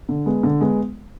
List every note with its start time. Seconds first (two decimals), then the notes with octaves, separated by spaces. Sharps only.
0.09 D3
0.26 G#3 B3
0.43 D3
0.61 G#3 B3